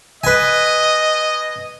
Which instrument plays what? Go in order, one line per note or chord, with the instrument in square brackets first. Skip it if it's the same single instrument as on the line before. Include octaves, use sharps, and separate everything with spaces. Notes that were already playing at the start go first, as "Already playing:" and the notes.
[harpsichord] B4 G#5 [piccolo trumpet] D#5